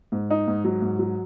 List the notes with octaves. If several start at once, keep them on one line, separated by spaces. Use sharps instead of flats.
G#2
D#4
G#2
F#3
G#2
F#3